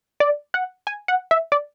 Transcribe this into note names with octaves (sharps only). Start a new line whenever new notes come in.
D5
F#5
G#5
F#5
E5
D5